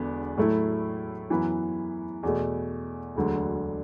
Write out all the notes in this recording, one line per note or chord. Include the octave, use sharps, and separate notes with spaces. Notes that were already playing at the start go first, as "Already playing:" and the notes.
Already playing: E1 E2 D3 B3 D4
A2 F#3 A3 E4
F#2 E3 B3
E2 B2 A3
E1 D2 D3 F#3